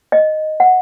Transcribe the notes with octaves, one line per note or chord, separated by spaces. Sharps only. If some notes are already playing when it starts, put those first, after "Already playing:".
D#5
F#5